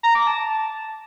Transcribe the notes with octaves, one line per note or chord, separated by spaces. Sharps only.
A#5
D6
A5